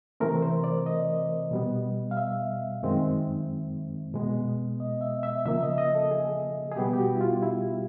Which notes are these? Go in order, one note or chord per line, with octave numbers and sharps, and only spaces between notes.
C3 E3 A3 C4 A#4
C5
D5
D#5
B2 G3 B3
F5
E5
F#2 D#3 G#3 C4
B2 G#3 B3
D#5
E5
E5
C#3 F3 A#3 E5
D#5
D#5
A4
G#4
G#4
B2 G3 B3 G4
G4
F#4
E4
F4
E4